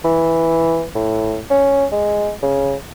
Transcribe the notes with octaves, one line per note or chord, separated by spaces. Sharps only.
E3
A2
C#4
G#3
C#3